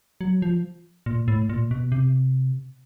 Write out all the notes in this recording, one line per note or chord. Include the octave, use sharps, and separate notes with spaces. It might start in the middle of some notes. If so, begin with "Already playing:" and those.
F#3
F3
A#2
A2
A#2
B2
C3